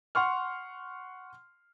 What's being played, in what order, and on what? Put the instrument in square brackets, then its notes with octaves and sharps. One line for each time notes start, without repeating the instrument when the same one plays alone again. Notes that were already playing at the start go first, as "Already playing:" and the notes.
[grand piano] F#5 C6 C#6 F6